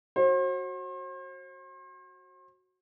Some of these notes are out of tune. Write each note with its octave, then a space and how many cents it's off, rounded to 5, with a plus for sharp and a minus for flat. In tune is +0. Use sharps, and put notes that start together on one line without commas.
F#4 +0 C5 +40